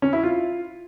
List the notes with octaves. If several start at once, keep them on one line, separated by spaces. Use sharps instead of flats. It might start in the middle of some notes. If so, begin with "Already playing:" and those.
C#4
E4
F4